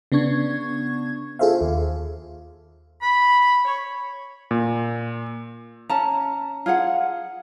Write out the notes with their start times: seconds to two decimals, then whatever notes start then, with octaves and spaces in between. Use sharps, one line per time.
0.12 C#3 B3 D4 C#6 G#6
1.39 F4 G#4 A4 C5 E5 F5
1.61 D#2
3.01 B5
3.65 C#5
4.51 A#2
5.89 C#4 A5 A#5
6.66 F4 G#4 F5 F#5